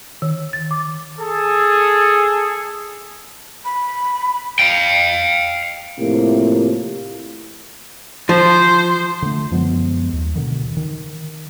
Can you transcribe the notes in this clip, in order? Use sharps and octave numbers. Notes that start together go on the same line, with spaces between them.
D#3
A6
D6
G#4 A4
B5
F5 G5
A2 C3 F3 A#3
F3 C5
D3 A3
F#2 F3 G#3 B3
D#2
B2 D3 D#3
D#3